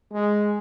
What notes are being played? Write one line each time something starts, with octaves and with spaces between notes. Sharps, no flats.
G#3